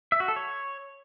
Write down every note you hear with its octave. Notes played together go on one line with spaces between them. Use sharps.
E5
F#4
A4
C#5